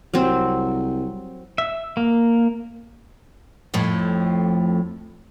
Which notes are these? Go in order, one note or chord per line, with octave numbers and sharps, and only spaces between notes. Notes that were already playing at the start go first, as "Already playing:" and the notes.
C2 F#3 C4
E5
A#3
F2 A2 F3